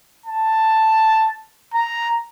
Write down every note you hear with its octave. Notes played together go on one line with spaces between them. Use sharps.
A5
A#5